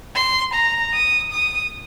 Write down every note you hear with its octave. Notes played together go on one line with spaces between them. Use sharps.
C6
A#5
D#6
D#6